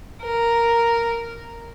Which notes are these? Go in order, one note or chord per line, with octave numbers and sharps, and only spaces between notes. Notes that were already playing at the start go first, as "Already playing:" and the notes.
A#4